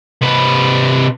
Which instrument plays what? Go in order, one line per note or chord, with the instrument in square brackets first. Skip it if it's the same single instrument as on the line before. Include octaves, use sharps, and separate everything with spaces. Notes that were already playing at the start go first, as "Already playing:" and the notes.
[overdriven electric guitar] C3 B4